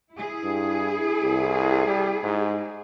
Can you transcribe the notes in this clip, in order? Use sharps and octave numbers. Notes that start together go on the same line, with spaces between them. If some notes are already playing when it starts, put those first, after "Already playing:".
E4 G#4
G2
C2
G3
G#2